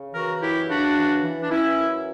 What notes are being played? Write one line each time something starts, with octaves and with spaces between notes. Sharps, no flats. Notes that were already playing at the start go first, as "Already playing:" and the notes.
Already playing: C#3
E3 F#4 A#4
F#2 E4 G4
C#3 D4 F#4
E3
E3
D4
E3 C#4 E4
F#2